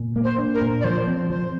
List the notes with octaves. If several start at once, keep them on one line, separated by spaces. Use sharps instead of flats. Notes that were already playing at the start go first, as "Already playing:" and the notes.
Already playing: A#2
A#3
C5
D4
A#4
A#2
D5
F3 C5
C4
F3 C5